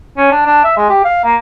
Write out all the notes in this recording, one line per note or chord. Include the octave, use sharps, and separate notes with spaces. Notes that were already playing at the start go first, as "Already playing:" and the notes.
C#4
D4
D4
E5
G#3
G4
F5
A#3